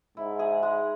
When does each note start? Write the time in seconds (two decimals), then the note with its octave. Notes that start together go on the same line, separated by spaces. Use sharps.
0.17 G#2 E4
0.39 G#4
0.63 G#3